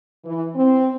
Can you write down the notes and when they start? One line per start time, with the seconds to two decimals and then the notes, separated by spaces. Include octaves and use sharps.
0.24 E3
0.55 C4